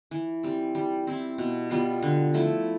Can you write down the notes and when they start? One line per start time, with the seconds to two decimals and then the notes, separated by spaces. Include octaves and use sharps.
0.11 E3
0.43 G3 C4
0.75 G3
1.07 C4 E4
1.38 B2
1.70 G3 B3 F4
2.03 D3
2.34 F3 A3 E4